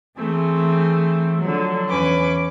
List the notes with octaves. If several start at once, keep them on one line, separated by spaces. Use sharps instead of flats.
E3 A3 C4 G#4
D3 F3 F#3
E2 C#4 B4 D6